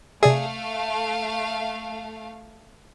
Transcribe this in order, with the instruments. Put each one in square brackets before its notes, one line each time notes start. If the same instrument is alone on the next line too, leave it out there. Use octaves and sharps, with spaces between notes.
[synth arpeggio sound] C3 D5 E5 [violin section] A3 F5 [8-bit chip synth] G#4